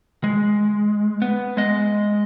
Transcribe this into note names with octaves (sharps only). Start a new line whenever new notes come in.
G#3
B3
G#3 D#5